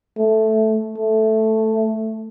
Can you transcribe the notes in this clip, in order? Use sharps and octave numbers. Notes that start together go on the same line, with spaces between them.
A3
A3